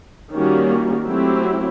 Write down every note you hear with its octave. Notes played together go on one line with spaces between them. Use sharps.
D#3 G3 A#3 C#4 F#4
F#3 A3 C4 E4 G4